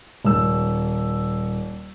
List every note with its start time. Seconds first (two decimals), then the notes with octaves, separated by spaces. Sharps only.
0.24 D#1 E6